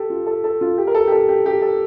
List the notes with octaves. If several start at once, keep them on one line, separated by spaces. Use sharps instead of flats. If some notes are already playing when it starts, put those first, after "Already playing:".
Already playing: G4 A4
F4
A4
A4
F4
G4
A#4
A4
G4
A4
G4
G4
A4